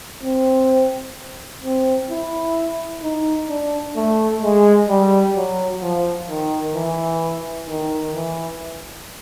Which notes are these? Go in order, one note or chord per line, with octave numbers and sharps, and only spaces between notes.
C4
C4
E4
D#4
D4
A3
G#3
G3
F#3
F3
D#3
E3
D#3
E3